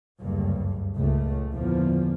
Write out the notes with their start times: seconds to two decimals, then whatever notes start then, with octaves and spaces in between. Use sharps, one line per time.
0.21 F#1 D2 G2
0.96 C#2 A#2 A3
1.53 E2 A#2 D3 F3